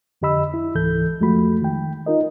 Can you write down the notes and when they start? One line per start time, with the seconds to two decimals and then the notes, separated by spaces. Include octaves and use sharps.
0.22 F2 D3 G4 D#5 B5 E6
0.54 E4
0.75 C#2 G#2 E3 A4 G6
1.20 F2 F3 G#3 A3 F#4 B5
1.62 D#3 G5
2.06 D#4 F4 A#4 D#5